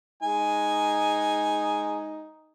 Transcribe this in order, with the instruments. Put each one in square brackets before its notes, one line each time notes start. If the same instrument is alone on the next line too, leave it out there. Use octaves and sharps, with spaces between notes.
[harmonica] G#3 G#5 [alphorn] D#4